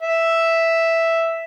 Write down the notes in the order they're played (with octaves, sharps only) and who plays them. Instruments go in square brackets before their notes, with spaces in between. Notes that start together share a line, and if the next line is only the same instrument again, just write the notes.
[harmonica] E5